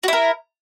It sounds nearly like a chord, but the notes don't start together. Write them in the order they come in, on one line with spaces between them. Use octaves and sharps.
F#4 E4 A#4